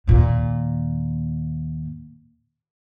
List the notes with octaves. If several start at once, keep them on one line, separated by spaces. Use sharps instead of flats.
D#2 A#2